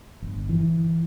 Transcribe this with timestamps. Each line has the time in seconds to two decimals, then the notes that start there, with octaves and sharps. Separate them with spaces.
0.22 G1
0.49 E3